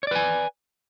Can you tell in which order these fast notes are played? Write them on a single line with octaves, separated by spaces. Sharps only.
C#5 D5 B4 G#5